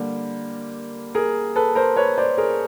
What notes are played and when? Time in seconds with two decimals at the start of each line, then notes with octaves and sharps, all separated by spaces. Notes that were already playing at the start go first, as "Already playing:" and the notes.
Already playing: D3 G3 A#3 D4
1.15 G#4 A#4
1.56 A4 B4
1.75 A#4 C5
1.97 B4 C#5
2.18 C5 D5
2.38 G#4 A#4